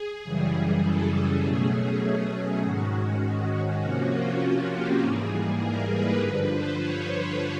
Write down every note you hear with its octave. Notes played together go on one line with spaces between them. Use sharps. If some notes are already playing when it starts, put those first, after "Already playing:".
Already playing: G#4
F#2 C#3 E3 G3
A4
B2 F#3 A3 C#4 G#4
G#2 D#3 G#3 C#4 F#4
C3 F3 A#3 C#4 F#4
F4
F4
G4
G#2 E3 G3 A#3 G#4
A#4
B4
G2 D3 F3 B4
C5
C#5